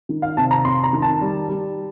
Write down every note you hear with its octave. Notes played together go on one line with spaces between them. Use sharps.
D#3
F5
C3 A5
A#5
F2 C6
A#5
D#3
A5
G3
G3